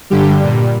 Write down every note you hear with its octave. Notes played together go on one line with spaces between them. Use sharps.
G2 D3 G3 G4
A#2 G3